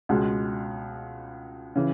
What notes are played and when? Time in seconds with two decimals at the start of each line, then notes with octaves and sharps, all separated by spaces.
0.09 C#2 B2 G#3
1.75 C#3 E3